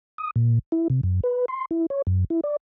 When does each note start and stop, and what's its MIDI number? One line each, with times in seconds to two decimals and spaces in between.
0.18 0.31 87
0.36 0.59 46
0.72 0.88 64
0.90 1.01 48
1.03 1.20 42
1.23 1.45 71
1.48 1.65 84
1.71 1.86 64
1.90 2.02 73
2.07 2.24 42
2.30 2.41 64
2.44 2.56 74